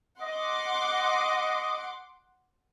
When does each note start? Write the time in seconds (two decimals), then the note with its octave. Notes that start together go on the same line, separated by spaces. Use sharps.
0.22 D#5 F#5 C6 D6